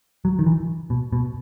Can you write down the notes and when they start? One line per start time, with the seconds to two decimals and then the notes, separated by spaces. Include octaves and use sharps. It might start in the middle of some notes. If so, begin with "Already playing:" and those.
0.25 F#3
0.39 D#3
0.46 E3
0.90 B2
1.13 B2